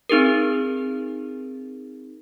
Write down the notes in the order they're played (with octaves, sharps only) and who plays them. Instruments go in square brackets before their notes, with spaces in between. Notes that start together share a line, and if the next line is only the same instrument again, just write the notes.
[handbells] C4 D#4 G#4 A#4